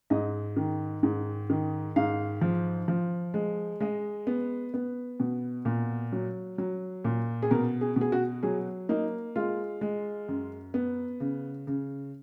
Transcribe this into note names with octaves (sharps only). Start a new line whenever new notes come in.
G#2 D#5
D#3
G#2
D#3
G#2 F5
F3
F3
G#3
G#3 D#5
B3
B3
B2
A#2
F#3
F#3
A#2
G#4
B2 A#4
G#4
B2 G#4
F#4
F#3 G#4
A#3 D#4
G#3 F4
G#3
F#2
B3
C#3
C#3